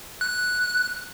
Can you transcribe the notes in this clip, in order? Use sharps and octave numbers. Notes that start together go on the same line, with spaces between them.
F#6